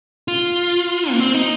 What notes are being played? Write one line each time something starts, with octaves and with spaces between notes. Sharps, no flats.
F4
A#3
C4
D#4